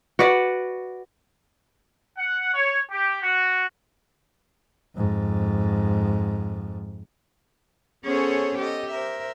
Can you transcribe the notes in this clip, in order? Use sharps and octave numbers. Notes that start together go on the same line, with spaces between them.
F#4 B4 D5 F#5
F#5
C#5
G4
F#4
F2 G#2
B3 C#4 G#4 A4 C5 C#5
G4 A4 D#5
A#4 C5 E5